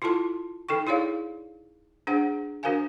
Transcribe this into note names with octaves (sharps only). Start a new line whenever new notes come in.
E4 F4 A4 A5 C6
D#4 A4 G5 C#6
E4 G#4 C#5 D5 F5
D4 G#4 C5 F#5
D4 F#4 A#4 C5 F5 G#5